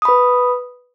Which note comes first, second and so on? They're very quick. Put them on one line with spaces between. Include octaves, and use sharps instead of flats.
D#6 B5 B4